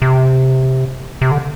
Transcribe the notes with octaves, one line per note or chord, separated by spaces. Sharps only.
C3
C3
D3